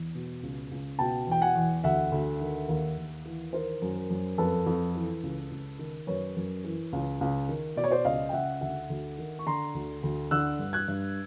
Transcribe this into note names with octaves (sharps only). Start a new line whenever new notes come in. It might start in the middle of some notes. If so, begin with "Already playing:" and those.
Already playing: E2
B2
C#2
C#2
B2 G5 A5
E2 G5
F#5 G#5
E2
D2 E5 F#5
D2
D#3
D#2
D#2
E3
D#3 A#4 C5
F#2
F#2
F2 A4 B4
F2
E3
C#2
C#2
D#3
F#2 B4 C#5
F#2
E3
C#2
C#2
D#3
B2 D5
C#5
C5 D5
C#2 D#5 F5
G5
C#2 E5 F#5
D2 E5 F#5
D2
D#3
C#6
D3 A#5 C6
D2
D2
D3 E6 F#6
G2
F#6 G#6
G2